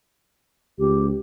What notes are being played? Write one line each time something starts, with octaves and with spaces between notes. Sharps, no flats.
C#2 G4